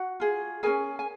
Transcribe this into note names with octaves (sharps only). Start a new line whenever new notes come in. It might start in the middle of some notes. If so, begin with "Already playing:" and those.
Already playing: F#4 F#5
F4 G#4
C#4 F#4 G#4 A#4 G#5
G#5